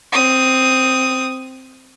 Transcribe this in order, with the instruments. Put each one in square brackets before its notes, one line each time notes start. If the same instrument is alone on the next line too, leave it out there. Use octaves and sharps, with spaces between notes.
[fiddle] C4 D#6